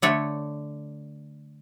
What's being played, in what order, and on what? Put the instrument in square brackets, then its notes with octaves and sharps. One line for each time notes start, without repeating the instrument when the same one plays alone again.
[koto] D3 A3 C#5